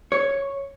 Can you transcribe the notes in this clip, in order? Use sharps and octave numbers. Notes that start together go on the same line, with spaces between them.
C#5